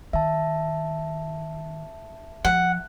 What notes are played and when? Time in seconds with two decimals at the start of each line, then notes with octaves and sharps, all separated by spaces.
0.13 D#3 E5 A5
2.45 F3 F#5